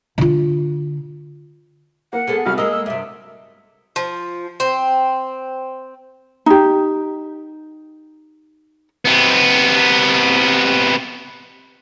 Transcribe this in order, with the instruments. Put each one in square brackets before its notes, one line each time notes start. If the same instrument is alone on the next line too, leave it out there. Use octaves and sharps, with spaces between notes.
[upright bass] D3 F4
[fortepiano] A#3 [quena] F#5
[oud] G#3 B3 A4
[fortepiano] C2 F#4 [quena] F6
[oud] G#3 A#3 [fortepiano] D#5 [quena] E6
[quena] E6
[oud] G2 C3 [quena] E5
[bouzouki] F3
C4
[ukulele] D#4 G4
[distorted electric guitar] C3 B3